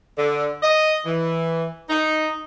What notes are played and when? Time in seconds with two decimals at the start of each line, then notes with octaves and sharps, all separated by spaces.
0.18 D3
0.62 D#5
1.06 E3
1.89 D#4